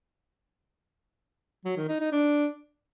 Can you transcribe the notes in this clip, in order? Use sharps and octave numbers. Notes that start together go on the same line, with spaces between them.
F#3
D#3
D#4
D#4
D4